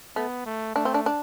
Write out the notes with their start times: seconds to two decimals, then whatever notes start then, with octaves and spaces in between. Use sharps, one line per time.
0.16 A3 B3
0.46 A3
0.76 A3 D4
0.85 C4
0.94 D4
1.06 D4